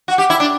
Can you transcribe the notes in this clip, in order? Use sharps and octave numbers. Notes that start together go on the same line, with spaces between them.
F#4
G4
E4
D4